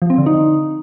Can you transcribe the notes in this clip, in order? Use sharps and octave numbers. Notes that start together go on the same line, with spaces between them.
F3
C4
D3
D#4